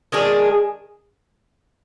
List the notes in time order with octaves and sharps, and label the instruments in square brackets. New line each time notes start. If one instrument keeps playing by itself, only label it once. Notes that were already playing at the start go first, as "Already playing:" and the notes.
[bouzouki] D#3 G#3 D4 G#4